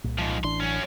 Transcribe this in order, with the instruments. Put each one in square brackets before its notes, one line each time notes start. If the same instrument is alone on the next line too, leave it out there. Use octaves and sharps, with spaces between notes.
[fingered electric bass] C2 A#2
[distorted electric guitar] G#2 F3
[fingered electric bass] A1 E3 D4 [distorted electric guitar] C6
[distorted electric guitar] F#2 C#4